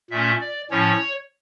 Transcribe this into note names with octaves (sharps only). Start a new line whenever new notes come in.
A#2 A3 C#4 E5
D5
A2 F3 C#4 C#5